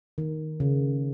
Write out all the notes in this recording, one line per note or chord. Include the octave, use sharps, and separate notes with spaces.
D#3
C#3